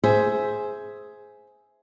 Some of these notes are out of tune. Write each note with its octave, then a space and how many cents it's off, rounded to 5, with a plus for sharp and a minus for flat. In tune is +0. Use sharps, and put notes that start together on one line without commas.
G#4 +10 C5 +0 E5 +0